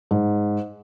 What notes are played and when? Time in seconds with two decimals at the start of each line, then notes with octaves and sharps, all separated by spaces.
0.11 G#2